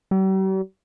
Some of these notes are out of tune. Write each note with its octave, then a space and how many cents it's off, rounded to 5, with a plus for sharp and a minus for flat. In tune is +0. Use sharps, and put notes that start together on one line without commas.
G3 -45